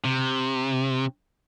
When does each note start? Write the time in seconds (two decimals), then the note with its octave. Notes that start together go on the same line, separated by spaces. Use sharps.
0.04 C3